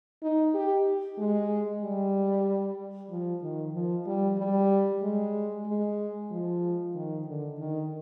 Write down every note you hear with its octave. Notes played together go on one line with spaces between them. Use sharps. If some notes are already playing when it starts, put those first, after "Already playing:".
D#4
G4
G#3
G3
F3
D#3
F3
G3
G3
G#3
G#3
F3
D#3
D3
D#3